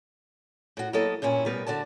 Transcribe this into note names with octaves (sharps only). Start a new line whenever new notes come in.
A2 F#4
F#3 A#3 B3 E4 A4 D#5
G2 A#2 C#4 E4
B2 G3 B3 A#4 B4
D3 F#4 D5 A5